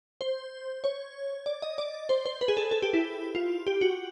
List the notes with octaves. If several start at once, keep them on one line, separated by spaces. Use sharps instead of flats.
C5
C#5
D5
D#5
D5
C5
C5
B4
G#4
A4
A4
G4
E4
F4
G4
F#4